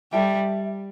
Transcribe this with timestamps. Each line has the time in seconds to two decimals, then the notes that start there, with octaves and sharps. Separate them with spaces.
0.13 G3 A4 E5 G5